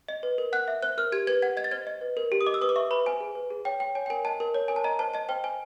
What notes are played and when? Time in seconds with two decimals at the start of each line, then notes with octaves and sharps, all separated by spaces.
0.08 D#5
0.23 B4
0.38 A#4
0.53 F#5 F#6
0.68 E5
0.83 C5 F#6
0.98 A#4 F6
1.12 G4 G#6
1.27 B4 G#6
1.42 F#5 G#6
1.57 D#5 G#6
1.64 A6
1.71 C5 G#6
1.87 D#5
2.01 B4
2.17 A#4
2.32 G4
2.41 D#6
2.46 D#5 D6
2.54 E6
2.62 B4 D#6
2.69 D6
2.76 E5 C#6
2.91 B4 B5
3.06 C5 G#5
3.21 G#4
3.35 B4
3.50 G#4
3.65 C#5 G5
3.80 G5
3.95 C#5 G#5
4.06 G5
4.10 A#4 G#5
4.25 D#5 A5
4.40 A#4
4.54 C#5
4.68 A#4 G#5
4.76 A5
4.84 D#5 A#5
4.99 C5 A5
5.14 D#5 A5
5.29 C5 G5
5.44 C5 G#5